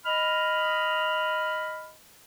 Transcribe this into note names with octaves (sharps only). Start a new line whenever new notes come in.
D#5 B5 F6